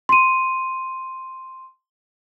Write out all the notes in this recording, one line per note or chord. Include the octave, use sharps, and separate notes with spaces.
C6 D#7